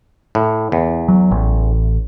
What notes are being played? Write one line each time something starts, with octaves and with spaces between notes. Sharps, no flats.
A2
E2
F#3
A1